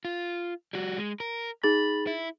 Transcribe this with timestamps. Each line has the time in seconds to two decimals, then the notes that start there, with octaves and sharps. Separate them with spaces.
0.05 F4
0.73 G3 F#4
0.98 G#3
1.20 A#4
1.63 D#4 G#4 B5 A6
2.07 E4